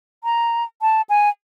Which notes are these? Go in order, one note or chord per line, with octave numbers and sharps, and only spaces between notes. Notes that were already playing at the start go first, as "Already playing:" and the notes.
A#5
A5
G#5